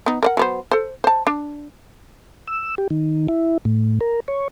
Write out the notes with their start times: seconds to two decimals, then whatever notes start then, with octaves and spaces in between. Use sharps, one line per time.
0.06 B3 D#4
0.23 A#4 D5 F#5
0.37 F#3 B3 C5
0.71 A4 C5
1.04 C5 A5
1.27 D4
2.47 E6
2.78 G4
2.90 D#3
3.29 E4
3.65 A2
4.01 A#4
4.28 C#5